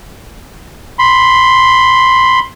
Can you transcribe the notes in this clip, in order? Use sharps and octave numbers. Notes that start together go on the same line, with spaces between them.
B5 C6